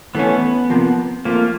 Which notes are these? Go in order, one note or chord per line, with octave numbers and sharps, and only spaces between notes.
E3 A3 B3 C#4
C3 F3 A#3
F3 A3 A#3 C4 F4